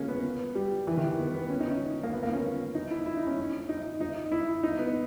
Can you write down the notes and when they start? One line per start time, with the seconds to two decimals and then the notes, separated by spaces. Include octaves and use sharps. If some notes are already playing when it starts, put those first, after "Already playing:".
Already playing: G#3 A#3 C#4
0.09 B3
0.55 G3
0.87 E3
0.97 D#3
1.19 B3
1.34 B3
1.50 C#4
1.60 D#4
1.70 C#4
2.03 A#3
2.13 B3
2.23 A#3
2.33 C#4
2.75 D#4
2.91 E4
3.06 E4
3.17 D#4
3.27 C#4
3.69 D#4
4.00 D#4
4.32 E4
4.63 D#4
4.79 B3